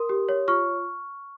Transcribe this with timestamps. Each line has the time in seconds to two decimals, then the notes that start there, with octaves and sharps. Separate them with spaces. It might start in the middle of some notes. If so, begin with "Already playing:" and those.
Already playing: A#4 C6 D#6
0.09 G4
0.29 C#5
0.48 F4 C#6 F6